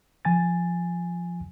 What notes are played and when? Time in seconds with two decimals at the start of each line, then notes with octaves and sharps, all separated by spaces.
0.25 F3 G#5 A6